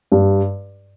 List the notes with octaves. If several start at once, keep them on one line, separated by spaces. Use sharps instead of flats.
G2